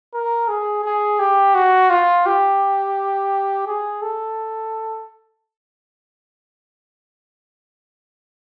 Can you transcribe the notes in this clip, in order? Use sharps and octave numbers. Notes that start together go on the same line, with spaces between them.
A#4
G#4
G#4
G4
F#4
F4
G4
G#4
A4